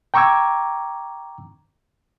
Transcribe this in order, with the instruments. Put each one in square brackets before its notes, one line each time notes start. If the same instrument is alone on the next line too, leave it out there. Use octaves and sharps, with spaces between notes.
[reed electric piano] G5 A#5 C#6 D6 E6 G#6